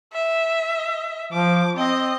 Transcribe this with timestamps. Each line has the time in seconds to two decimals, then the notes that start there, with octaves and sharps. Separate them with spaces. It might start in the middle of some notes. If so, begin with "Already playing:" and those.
0.13 E5
1.33 F3 D6
1.77 C4 D#5